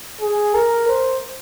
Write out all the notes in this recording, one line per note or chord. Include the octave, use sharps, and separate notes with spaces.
G#4
A#4
C5